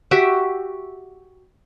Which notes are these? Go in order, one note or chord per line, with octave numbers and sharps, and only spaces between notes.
F#4 G4 E5